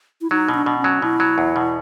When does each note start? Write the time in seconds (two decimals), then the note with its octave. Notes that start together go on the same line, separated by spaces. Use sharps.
0.21 E4
0.31 F#3 D#4
0.48 B2
0.55 D4
0.66 B2
0.79 C#4
0.84 F#3
1.02 B2 E4
1.20 F#3
1.38 E2
1.56 B2